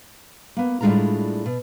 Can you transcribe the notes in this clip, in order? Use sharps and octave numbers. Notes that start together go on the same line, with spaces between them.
A#3 B3
A2 G3 G#3 D4 F4 A#5
B2